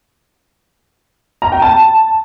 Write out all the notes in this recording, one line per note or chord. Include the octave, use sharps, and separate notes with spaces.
A#5
G5
A5